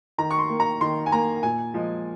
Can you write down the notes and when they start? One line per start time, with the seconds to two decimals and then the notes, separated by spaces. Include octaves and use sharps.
0.18 D#3 A#5
0.31 C#6
0.39 C6
0.50 A#3
0.60 A#5
0.81 D#3 C6
1.06 G#5
1.12 A#3 A#5
1.43 A#2 G#5
1.74 F3 G#3